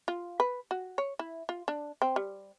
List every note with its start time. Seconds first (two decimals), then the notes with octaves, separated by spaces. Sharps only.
0.08 F4
0.40 B4
0.71 F#4
0.98 C#5
1.19 E4
1.49 F4
1.68 D4
2.02 C4
2.16 G3